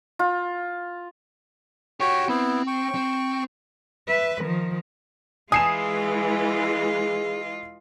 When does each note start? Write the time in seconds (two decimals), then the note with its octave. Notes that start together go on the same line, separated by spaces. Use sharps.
0.19 F4
2.00 F#4 G4 C#5 F#5 G5
2.28 B3 C4 E4
2.67 G5 C#6
2.95 C4
4.08 B4 E5
4.42 D#3 F3
5.52 E3 G#3 F4 G#4 D#5 D#6 C7 E7